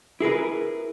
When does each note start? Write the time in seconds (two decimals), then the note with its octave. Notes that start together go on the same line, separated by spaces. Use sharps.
0.20 E4 G#4 A#4 B4